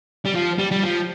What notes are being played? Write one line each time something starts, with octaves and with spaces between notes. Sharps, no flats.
G3
F3
G3
G3
F3